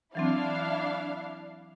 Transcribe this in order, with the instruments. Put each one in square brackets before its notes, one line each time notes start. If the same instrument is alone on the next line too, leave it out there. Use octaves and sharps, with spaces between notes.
[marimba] E3 F#3 C4 [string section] D4 E4 F5